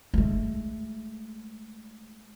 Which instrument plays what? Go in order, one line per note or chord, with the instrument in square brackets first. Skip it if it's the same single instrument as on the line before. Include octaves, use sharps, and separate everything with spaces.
[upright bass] G#3 A3